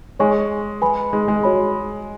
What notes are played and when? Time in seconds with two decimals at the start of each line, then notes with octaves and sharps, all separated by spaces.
0.19 G#3 C#5 G#5 C#6
0.82 B4 G#5 B5
1.13 G#3
1.28 G#3
1.43 F#4 C#5 B5